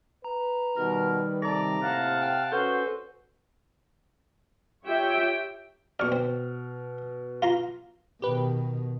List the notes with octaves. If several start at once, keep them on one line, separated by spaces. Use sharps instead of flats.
B4 A#5
B2 D#3 G3 A#4
C3 A4 D5 A#5 A#6
A2 A#3 F5 F#5 A5
G5 F6
C#4 F#4 A4 B4 C5
F4 G4 C#5 E5 G5
B2 D5 C#6 F6
C4
F4 A#5 C6
B2 D#3 G4 B4